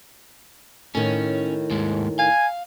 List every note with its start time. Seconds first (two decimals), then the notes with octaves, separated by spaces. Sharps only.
0.95 A2 D#3 C#4
1.71 D#2 G#2 G#3
2.19 F5 G#5